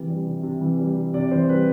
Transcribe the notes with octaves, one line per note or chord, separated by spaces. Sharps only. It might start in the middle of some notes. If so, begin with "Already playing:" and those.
Already playing: C3 E3 G4
G3
C3
C3
E3
G3
C3
C3 D5
E3 C5
G3 B4